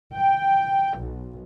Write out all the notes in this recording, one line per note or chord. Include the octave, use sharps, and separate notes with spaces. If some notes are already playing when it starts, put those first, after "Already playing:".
G5
B1